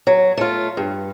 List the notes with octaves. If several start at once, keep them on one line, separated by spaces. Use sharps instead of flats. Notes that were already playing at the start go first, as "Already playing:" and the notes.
F#3
A3 F4
G2